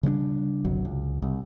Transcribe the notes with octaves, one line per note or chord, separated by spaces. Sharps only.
C#3 G3 B3 D4
G1 C2 F#3
C#2
C2